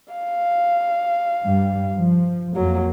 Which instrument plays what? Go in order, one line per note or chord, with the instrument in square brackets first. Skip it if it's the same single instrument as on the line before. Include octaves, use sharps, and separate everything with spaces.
[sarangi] F5
[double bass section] G2 G3
F3
[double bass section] F2 A#3 [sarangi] F#3